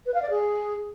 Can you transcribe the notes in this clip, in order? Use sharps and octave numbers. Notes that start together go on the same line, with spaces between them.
B4
F5
D5
G#4